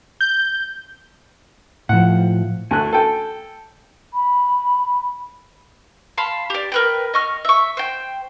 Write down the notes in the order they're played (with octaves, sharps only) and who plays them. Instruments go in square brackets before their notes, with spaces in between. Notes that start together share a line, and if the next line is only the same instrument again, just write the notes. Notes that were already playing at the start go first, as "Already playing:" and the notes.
[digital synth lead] G6
[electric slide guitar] A2 F3 [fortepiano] F#5
[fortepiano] D2 A3 F#6 [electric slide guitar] G#5
[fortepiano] A4 G5
[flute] B5
[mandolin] F5 A5 B5 C6
G4 D5
A#4 B4 G5
D#5 C#6 F6
E5 C#6
C5 G5